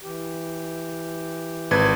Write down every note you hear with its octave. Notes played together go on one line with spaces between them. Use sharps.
E3 G4
G#1 B4 G#6